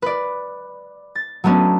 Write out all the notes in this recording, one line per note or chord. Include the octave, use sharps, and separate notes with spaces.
B4 D5
A6
F#3 A3 B3 C#4 D4